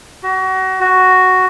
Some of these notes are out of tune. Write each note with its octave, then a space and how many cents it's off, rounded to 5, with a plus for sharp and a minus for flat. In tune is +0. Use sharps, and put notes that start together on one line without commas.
F#4 +30
F#4 +5